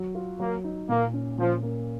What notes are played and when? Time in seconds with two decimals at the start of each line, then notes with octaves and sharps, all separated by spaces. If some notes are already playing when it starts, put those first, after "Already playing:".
Already playing: F#3 F#4
0.15 F4
0.40 F#3 A#3
0.64 D#4
0.89 A#2 A#3
1.13 C#4
1.38 A#2 F3
1.62 A#3